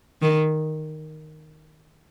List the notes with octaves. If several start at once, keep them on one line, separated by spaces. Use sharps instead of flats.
D#3